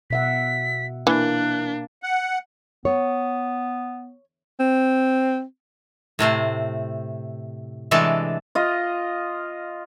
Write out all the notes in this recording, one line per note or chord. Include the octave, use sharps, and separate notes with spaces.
B2 E5 F#5 B6
E3 A#3 D4 F#6
F#5
B3 C#5
C4
A2 C3 A3 C5
C3 E3 G#3 A3 D4 A4
F4 D#5